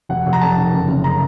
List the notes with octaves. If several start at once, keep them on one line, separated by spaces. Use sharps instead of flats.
F1 F#5
F1
A#5
F2 A5
D#3
F#1
F#1
A#5